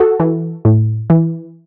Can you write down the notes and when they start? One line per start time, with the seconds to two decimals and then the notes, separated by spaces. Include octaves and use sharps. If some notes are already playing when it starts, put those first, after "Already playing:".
Already playing: F#4 A4
0.20 E3
0.65 A2
1.10 E3